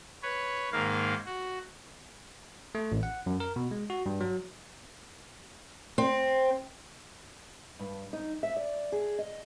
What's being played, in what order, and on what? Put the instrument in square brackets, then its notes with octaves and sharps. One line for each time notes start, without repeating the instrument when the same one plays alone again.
[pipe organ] B4 C#5
G#2 D#3 A#3 F5
F#4
[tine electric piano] A3
A1
F#5
F#2
A#4
B2
G#3
F#4
G2
F#3
[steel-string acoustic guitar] C4
G2
D#4
E5
D5
G#4
D#5